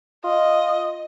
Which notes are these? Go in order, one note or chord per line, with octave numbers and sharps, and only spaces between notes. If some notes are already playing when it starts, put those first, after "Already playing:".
F4 D#5